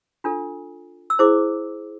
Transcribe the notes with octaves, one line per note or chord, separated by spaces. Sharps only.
D4 F4 A4
E6
E4 G#4 C5 D6